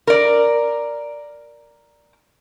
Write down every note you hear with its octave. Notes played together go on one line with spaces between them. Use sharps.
A#4 D5